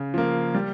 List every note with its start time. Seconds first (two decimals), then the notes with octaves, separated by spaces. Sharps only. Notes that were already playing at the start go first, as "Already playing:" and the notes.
Already playing: C#3
0.14 F3 A#3
0.55 G3